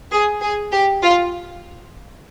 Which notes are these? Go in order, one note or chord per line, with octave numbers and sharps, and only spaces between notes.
G#4
G#4
G4
F4